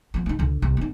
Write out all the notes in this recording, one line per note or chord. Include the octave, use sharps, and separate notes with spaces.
F3 B3
A#3 D#4
C#2 D3
C2
B3 D#4